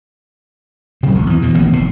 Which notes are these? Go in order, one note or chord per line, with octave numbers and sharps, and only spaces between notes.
C3 F#3 G3 C4
G#1 F2 C#3
E2 E3
B2 E3
A1 D#3 A#3 B3
F1 A2